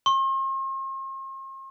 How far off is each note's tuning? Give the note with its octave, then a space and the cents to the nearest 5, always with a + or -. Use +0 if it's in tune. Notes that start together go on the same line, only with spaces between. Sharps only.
C6 +45